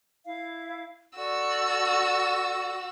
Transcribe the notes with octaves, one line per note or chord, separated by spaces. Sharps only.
E4 F5
F#4 A4 D5 C#6 E6